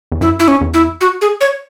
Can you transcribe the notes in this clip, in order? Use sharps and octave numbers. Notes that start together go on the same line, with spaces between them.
E2
F#2 E4
E4
C#4
E2
E4
F#4
G#4
C#5